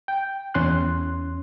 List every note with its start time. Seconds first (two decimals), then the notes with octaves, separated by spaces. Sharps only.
0.08 G5
0.54 E2 C#4 C6 F#6